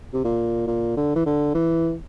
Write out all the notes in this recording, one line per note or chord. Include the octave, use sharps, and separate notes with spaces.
C3
A#2
A#2
D3
E3
D3
E3